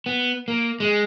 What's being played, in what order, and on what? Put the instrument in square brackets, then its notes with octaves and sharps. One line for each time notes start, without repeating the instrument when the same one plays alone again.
[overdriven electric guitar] B3
A#3
G#3